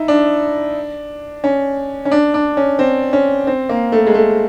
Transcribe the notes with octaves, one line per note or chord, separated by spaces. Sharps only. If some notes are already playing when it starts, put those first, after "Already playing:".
Already playing: D#4 E4
D4
C#4
C#4
D4
D4
C#4
C4
C#4
C4
A#3
A3
G#3
A3